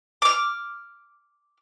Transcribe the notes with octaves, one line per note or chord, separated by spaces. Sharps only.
D6 F6